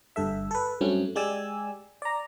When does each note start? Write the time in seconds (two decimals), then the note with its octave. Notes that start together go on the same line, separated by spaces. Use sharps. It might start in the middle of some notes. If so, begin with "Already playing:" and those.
0.16 G1 G2 A4 E5
0.51 A4 B4
0.81 G2 F#3 A3 C4 C#4
1.16 G#3 G4 D5 G#5 E6
2.02 D5 A#5